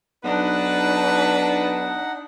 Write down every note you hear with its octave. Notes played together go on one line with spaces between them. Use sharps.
B1 D4 D#4 B4 F#5